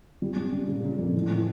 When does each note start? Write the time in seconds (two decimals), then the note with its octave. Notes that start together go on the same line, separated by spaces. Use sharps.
0.22 G3
0.36 G3
0.52 C#3
0.68 A#2 C#3
0.84 C#3
0.99 F2
1.15 A2 E3
1.31 E3